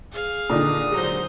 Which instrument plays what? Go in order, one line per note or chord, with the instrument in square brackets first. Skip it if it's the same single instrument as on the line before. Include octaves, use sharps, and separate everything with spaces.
[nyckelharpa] G#4 F5
[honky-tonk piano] A#2 D3 [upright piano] D#3 D#4 A4 [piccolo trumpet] D#6
[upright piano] F#3 G#3 [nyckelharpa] D#4 C5